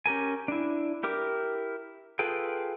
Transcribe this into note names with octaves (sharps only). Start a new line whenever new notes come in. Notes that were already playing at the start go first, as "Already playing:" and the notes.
C#4 G4 A#4 G#5
D4 E4
E4 G4 A#4 D6
F4 G#4 A4 B4 G5